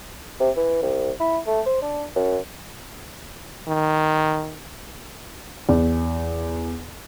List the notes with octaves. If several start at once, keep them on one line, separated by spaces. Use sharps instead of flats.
C3
E3
C2
E4
A3
C5
D4
F#2
D#3
E2